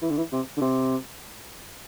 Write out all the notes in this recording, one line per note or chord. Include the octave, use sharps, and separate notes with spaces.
E3
D3
E3
C3
D3
C3